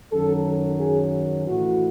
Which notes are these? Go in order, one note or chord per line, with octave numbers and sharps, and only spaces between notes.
F#2 D#3 F#3 A4
G#4
A2 E3 F#4